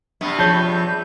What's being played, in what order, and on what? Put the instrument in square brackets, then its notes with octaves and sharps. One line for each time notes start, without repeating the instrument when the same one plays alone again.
[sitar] G2 C3 B3
[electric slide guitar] F3 [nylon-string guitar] G#4 C#5 [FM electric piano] A5 G6